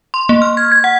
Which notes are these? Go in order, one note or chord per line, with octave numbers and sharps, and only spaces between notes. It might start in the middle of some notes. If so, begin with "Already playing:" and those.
C6
A#3
F6
G#6
G#6
F#5